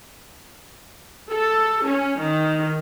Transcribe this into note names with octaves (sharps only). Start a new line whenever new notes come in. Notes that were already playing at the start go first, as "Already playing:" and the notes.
A4
C#4
D#3